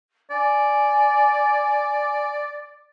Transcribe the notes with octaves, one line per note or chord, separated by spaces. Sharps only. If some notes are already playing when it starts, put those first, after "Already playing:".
D5 G#5